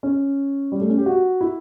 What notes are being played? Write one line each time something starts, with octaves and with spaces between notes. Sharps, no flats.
C#4
G3
A3
C#4
G4
F#4
E4